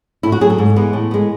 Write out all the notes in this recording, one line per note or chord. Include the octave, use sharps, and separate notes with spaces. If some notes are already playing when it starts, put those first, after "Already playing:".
A2 E4
F#4
F#3 A3 G#4
A4
G#2
E3 G#3 B3
A2
G#3 B3